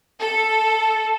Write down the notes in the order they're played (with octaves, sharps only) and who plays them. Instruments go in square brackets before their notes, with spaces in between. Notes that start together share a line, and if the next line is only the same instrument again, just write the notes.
[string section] A4